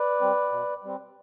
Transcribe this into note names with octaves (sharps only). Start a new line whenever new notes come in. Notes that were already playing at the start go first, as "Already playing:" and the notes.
Already playing: B4 D5
G3 C4
B2
G3 C4